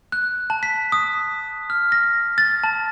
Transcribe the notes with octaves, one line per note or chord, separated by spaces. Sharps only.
F#6
A5
B6
D#6
F6
A#6
A6
A5